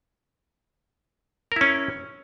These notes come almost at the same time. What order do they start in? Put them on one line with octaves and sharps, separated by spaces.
A#4 E4 C#4